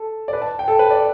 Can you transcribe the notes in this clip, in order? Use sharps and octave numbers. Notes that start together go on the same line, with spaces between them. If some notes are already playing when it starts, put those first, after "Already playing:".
Already playing: A4
D5
B4
A5
G5
A4
B4
D5